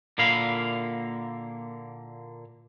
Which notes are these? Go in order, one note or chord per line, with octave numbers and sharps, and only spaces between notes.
A#2 D3 A#3 E4 F5 B5